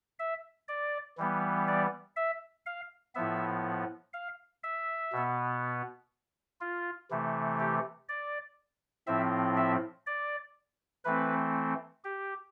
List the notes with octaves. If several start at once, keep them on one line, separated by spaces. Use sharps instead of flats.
E5
D5
E3 G3 B3
D5
E5
F5
A2 F3 B3 E5
F5
E5
B2 B3
F4
C3 E3 A3
G4
D5
A2 F3 C4 E5
E5
D5
E3 A3 C4 B4
G4